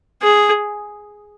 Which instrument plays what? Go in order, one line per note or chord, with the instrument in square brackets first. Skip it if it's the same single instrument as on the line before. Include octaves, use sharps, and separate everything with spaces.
[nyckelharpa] G#4